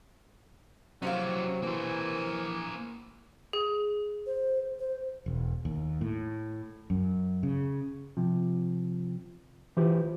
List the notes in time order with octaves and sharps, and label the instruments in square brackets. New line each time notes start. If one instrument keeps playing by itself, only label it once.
[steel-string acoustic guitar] C3 C4 F5 [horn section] F#3 [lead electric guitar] C#4 E4
[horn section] E3 A#4 G#5 [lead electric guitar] A#3 C5
[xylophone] G#4
[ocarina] C5
C5
[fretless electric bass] E1
D#2
A2
F#2
C#3
[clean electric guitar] C3 F3
E3 E4 F4 G4 C5